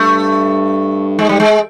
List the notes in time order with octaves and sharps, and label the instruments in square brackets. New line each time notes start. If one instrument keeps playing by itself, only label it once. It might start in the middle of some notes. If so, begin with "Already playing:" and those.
Already playing: [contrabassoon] G2 [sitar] A3
[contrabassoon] G#2 [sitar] G#3
[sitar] G3
G#3